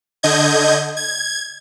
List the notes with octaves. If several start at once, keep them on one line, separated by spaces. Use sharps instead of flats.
D3 D#5 G6 G#6
G#6